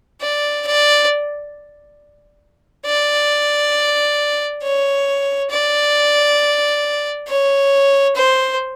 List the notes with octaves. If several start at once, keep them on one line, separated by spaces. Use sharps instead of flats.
D5
D5
D5
C#5
D5
C#5
C5